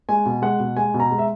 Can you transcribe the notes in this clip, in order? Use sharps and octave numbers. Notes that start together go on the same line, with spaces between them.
G#3 G#5
B2
G#3 F#5
B2
G#3 G#5
B2
A#5
G#3
E5